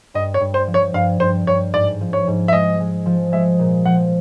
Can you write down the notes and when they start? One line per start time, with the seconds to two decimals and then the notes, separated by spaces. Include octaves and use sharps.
0.14 G2 D#5
0.34 C#5
0.41 G2
0.54 C5
0.67 F3
0.74 C#5
0.94 G2 F5
1.20 G2 C5
1.47 G2 C#5
1.74 G#2 D5
2.01 F3
2.13 C#5
2.27 G#2
2.48 E5
2.53 G#3 D#5
2.80 G#3
3.06 F3
3.32 G#3 E5
3.59 A#2
3.85 F3 F#5